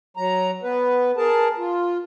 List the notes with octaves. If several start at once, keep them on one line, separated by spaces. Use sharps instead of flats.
F#3 A#5
B3 B4
G#4 A#4 A5
F4